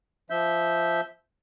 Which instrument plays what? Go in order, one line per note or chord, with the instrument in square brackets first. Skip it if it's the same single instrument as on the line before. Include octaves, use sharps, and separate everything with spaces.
[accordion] F3 E5 G6